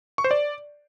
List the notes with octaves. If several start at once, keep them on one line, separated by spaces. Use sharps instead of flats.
C#6
C5
D5